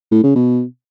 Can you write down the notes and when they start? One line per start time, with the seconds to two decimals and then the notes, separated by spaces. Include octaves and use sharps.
0.11 A2
0.23 C#3
0.35 B2